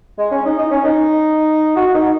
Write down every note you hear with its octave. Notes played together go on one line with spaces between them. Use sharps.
G#3
C#4
D#4
D#4
C#4
D#4
F#4
D#4